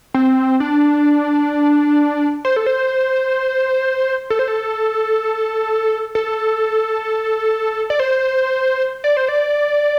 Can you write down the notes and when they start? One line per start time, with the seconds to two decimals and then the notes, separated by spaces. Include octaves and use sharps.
0.14 C4
0.60 D4
2.45 C5
2.56 A4
2.66 C5
4.30 A4
4.39 C5
4.48 A4
6.15 A4
7.90 D5
8.00 C5
9.04 D5
9.17 C5
9.28 D5